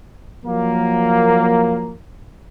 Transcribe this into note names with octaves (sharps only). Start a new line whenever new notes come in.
F3 F#3 A#3